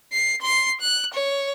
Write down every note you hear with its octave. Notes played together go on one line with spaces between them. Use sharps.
C7
C6 C7
F#6
C#5